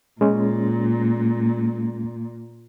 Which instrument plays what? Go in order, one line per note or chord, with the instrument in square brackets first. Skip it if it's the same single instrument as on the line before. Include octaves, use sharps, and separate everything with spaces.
[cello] A#2 [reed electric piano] G#3 C#4